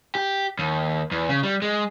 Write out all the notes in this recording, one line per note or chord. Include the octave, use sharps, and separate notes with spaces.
G4
D#2
E2
C#3
G3
G#3